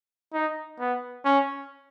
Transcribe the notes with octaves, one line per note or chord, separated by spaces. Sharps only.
D#4
B3
C#4